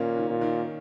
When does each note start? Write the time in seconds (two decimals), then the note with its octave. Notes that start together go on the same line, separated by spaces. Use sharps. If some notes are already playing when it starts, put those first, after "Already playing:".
Already playing: A#2 D#3 A#3 C#4
0.17 D#3
0.29 A#2
0.41 D#3